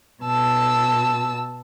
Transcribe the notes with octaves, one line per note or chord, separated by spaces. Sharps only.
B2 A5 E6